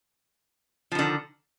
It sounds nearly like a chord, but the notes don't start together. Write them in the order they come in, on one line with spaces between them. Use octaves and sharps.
F3 D#3 D3